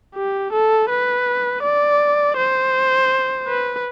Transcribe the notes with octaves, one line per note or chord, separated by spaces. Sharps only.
G4
A4
B4
D5
C5
B4